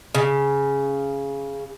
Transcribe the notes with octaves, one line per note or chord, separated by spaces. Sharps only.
C#3